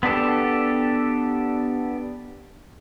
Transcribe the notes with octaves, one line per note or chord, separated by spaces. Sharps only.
B3 D4 G4 A4